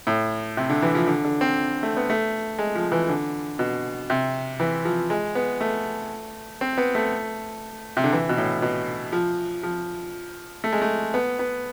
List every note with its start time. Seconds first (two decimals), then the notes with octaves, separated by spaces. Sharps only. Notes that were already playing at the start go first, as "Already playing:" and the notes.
0.07 A2
0.57 C3
0.69 D3
0.82 E3
0.95 F3
1.07 D3
1.24 D3
1.41 C4
1.83 A3
1.97 B3
2.10 A3
2.59 G#3
2.75 F3
2.92 E3
3.09 D3
3.59 B2
4.10 C3
4.60 E3
4.85 F3
5.10 G#3
5.35 B3
5.61 A3
6.61 C4
6.78 B3
6.95 A3
7.97 C3
8.04 D3
8.13 E3
8.29 B2
8.37 A2
8.62 B2
9.12 F3
9.63 F3
10.64 A3
10.73 G#3
10.82 A3
11.14 B3
11.39 B3